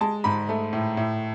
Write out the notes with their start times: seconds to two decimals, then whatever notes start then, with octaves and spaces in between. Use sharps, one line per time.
0.01 G#3 A5
0.24 G#2 B5
0.49 A3
0.73 A2
0.97 A2